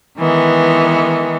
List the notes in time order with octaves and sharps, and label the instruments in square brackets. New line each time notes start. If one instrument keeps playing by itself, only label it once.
[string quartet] D#3 E3 G#3 B3